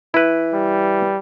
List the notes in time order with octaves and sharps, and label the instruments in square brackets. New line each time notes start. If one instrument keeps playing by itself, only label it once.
[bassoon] E3 [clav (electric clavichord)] E4 B4
[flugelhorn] G3